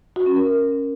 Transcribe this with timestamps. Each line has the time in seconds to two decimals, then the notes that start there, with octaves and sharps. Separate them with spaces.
0.16 F#4
0.26 C#4
0.36 A#4